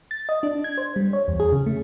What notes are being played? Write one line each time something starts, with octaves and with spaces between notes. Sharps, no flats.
A6
D#5
D4
G#6
C5
G3
C#5
E2
G#4
C#3
A3